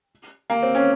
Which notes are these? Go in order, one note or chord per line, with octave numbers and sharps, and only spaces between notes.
A#3
C4
C#4